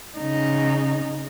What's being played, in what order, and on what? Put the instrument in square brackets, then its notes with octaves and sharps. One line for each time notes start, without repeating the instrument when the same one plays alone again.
[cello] C#3 D#4